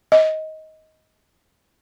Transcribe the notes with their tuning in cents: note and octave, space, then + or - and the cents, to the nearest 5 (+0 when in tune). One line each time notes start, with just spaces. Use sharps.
D#5 +15